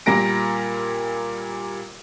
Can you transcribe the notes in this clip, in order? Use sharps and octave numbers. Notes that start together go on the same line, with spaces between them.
A#2 G3 A#3 A#4 A#6 D7